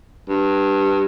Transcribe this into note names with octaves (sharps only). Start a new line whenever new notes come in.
G2